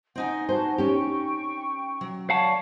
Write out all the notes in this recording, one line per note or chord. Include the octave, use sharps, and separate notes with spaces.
C4 D#4 F#5 G#5
F#4 C5 A5
C#4 G4 G5 C#6
F#3
C#5 D5 F5 F#5 A5 C#6